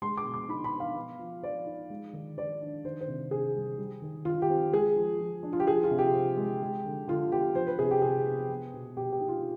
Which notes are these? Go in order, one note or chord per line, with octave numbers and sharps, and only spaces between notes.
G#3 C6
D6
B2
D6
D#4 B5
B5
B3
F5
B3
F3
F3 D5
D#4
G#3
D#3
D#3 D5
D4
D#3 C5
C5
C3
C3 G#4
G3
G3
D#3
D#3 F4
G4
C4
G#3 G#4
F3
F3
D4
F4
G4
F3 G#4
F4
C3
G4
C4
G#3
G#3
D3
D3 F4
B3 G4
F3 C5
B4
C3 G#4
G4
C3 G#4
B3
B3
B2
B2 G4
G4
D#4
F4